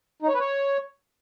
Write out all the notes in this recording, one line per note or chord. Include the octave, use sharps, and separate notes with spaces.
D#4
C#5
B4
C#5